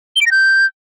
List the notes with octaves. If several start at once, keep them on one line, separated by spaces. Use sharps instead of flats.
G7
D7
A#6
G6